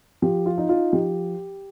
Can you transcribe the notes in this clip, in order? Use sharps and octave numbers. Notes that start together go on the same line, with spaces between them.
F3 G4
F4
D#4
F4
F3 G4